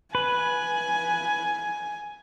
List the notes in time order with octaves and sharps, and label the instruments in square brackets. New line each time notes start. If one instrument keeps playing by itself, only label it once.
[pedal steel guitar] B4 [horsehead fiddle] G#5